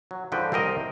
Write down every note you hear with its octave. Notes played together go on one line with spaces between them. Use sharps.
F#3
G#2 D3 F3 F#4 B4 G5
C2 C4 A#4 D#5